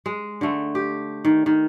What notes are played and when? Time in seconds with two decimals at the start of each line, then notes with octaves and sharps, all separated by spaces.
0.06 G#3
0.41 D3 A3
0.75 G4
1.25 D#3
1.46 D#3